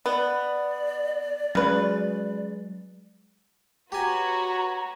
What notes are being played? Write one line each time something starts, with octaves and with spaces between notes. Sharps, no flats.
B3 D5
C#3 F#3 G#3 B4
F#4 G4 B4 C#5 G#5 A#5